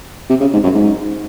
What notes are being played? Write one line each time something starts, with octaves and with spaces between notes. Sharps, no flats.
C3
C#3
G#2
F#2
G#2